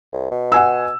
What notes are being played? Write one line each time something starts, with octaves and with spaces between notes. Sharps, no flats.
C2
B2
F#5 G#5 E6